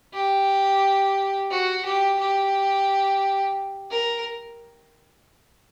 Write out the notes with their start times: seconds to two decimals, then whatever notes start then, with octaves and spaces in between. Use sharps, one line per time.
0.14 G4
1.50 F#4
1.85 G4
2.20 G4
3.91 A#4